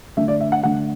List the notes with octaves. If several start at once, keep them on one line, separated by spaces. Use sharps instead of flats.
D3 A3 D4 E5
D5
E5
F#5
D3 A3 D4 F#5